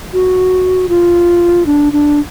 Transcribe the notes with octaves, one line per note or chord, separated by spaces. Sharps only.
F#4
F4
D4
D4